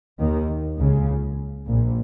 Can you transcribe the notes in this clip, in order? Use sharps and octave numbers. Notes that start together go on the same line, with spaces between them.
D#2 D#3
C#2 C#3
A#1 A#2